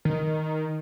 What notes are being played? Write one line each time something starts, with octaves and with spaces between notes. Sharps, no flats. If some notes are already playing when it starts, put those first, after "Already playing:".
D#3